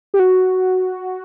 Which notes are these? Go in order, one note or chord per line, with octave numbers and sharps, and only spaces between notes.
G4
F#4